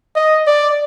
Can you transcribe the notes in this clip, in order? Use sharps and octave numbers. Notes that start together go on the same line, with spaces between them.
D#5
D5